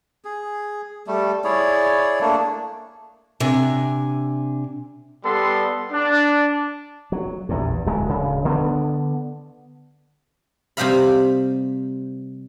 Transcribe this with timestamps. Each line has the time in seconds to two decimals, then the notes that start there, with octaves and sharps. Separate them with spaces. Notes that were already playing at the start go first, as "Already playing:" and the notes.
0.25 G#4
1.07 G3 A3
1.44 E4 G#4 C#5 D5
2.21 A3 A#3 D4
3.40 C3 D4 G#5
5.23 G3 B3 A4 C6
5.90 D4
7.12 F#3
7.49 A#1 E2 G2
7.86 D1 G#3
8.08 D1 C#3
8.45 D3 B3 C4 D4
10.77 C3 G3 C5 D#5 F5 B5